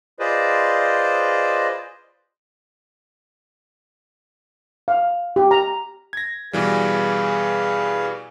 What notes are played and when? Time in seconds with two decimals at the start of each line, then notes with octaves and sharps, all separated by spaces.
0.20 F4 G#4 B4 C5 D5 D#5
4.88 F5
5.36 G4
5.51 A#5
6.13 G#6 A#6
6.53 B2 E3 G3 G#4 B4 F5